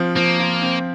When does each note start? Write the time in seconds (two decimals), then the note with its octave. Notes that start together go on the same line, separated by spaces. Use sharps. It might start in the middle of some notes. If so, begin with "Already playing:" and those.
Already playing: F3 C4 F4
0.16 F3 A#3
0.39 F4
0.62 C4